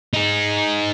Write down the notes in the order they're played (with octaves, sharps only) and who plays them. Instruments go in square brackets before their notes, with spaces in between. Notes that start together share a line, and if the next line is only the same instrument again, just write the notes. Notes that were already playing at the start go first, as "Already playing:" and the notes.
[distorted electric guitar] D#4 G#4